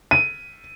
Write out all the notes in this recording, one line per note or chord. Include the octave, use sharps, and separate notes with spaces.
D#7